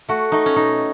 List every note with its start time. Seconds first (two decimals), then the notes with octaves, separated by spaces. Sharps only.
0.08 A3 F#4
0.32 A3 D#4
0.46 C#4
0.56 B2 D#4